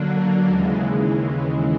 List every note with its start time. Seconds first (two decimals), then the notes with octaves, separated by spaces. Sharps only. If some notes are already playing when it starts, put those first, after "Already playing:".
Already playing: D3 F#3 A#3 D4
0.47 D#2 C#3 E3 G#3